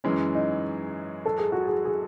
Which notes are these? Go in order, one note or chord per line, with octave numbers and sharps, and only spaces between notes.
F#2 E3 G#3 C#4
D#4
A4
G#4
F#4
G#4
G#4